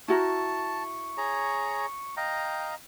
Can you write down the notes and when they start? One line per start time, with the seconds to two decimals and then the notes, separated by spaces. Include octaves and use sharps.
0.08 E4 F#4 A#4 A5 C#6
1.17 G#4 C#5 A#5
2.17 D#5 F5 G5 A#5